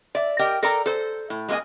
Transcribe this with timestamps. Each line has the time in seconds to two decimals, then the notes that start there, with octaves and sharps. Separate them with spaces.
0.15 D5 E5
0.39 G4 A#4 D#5 G5
0.63 A4 A#4 D5 G5 A#5
0.86 A4 C5
1.30 A2
1.48 G#3 A#3 G#4 D#5 G#5